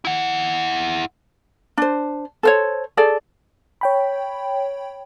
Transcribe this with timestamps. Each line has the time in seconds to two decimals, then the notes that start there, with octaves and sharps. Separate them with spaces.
0.05 E4 F#5
1.78 D4 C5
2.43 A4 C5 C#5
2.97 G#4 A4 D5
3.81 C#5 G5 B5